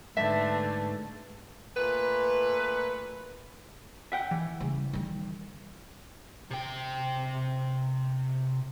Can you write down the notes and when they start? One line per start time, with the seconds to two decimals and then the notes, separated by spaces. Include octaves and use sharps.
0.17 G#2 D3 A3 B4 E5 A5
1.76 A#2 A3 B4
4.12 E5 F#5 G5
4.31 E3
4.60 C#3 G3
4.93 D#3 G3
6.50 C3 G5